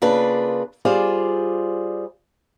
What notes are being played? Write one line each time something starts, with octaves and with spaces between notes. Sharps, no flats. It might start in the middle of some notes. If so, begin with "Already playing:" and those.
C#3 A#3 D4 F4 B4
G3 F4 G#4 C5 D5